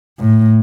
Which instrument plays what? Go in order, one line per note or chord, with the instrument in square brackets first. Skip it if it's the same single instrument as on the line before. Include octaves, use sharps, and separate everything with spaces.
[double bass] A2